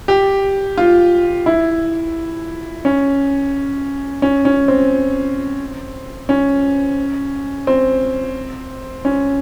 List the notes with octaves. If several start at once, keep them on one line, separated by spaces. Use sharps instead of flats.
G4
F4
E4
C#4
C#4
C#4
C4
C#4
C4
C#4